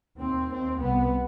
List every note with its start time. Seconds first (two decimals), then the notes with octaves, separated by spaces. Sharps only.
0.19 D#2 C4
0.50 D#2 C4
0.80 C2 C3 B3